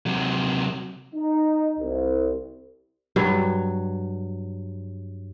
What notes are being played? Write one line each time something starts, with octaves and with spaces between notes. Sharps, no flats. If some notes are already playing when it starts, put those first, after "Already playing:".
C3 F#3
D#4
C2
G2 F#3